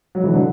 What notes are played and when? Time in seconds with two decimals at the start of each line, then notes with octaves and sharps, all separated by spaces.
0.15 F#3
0.24 E3
0.34 D3 F#3